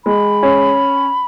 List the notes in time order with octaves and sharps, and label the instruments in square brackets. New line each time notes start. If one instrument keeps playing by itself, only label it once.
[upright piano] G#3 [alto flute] B5
[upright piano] C#4